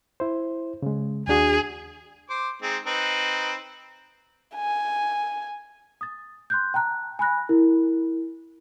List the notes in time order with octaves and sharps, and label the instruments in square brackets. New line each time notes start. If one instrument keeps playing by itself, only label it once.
[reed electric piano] E4 C5
C#3 G#3
[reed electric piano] D#2 D4 F#4 [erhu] G#4
[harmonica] C5 D6
G#3 C4 D#4
C4 D#4 B4
[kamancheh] G#5
[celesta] D#6 A6
C6 F#6 G6
G5 A5 A#5 F#6
G#5 B5 F#6 A#6
E4 A#4